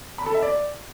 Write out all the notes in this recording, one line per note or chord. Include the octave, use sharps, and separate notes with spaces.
B5
A4
E5
D5